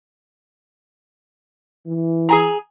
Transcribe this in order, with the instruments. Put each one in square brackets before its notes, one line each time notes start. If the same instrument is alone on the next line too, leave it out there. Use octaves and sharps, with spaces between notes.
[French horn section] E3
[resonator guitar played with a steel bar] G#4 G#5 A#5